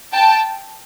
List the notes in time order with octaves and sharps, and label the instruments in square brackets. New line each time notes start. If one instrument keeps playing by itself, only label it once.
[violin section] G5 A5